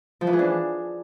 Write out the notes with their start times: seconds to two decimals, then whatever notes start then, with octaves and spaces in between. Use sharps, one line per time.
0.21 F3
0.27 E3
0.33 G#4
0.39 D4